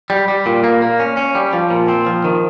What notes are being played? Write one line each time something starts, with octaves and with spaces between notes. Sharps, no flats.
G3
G3
A#2
A#3
A#3
C#4
C#4
G3
F3
A#2
C4
F3
D#3